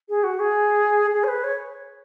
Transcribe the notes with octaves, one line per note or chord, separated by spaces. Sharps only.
G#4
F#4
G#4
G#4
C#5
B4
C#5